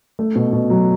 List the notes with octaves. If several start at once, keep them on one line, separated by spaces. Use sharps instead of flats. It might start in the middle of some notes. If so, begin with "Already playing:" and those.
A3
B2
B2
F#3